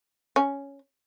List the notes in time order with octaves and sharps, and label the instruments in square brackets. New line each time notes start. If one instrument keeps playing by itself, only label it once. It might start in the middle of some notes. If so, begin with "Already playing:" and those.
[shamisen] C#4